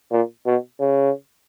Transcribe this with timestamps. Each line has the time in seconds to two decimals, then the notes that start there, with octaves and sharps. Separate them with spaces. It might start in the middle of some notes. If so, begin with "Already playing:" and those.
0.11 A#2
0.46 B2
0.80 C#3